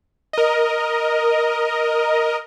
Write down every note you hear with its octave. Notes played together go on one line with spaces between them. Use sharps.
A#4 D#5